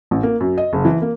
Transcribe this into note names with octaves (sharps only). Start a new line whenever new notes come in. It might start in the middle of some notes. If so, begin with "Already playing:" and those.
A1
A#3
F#2
D#5
F#1
E3
A#3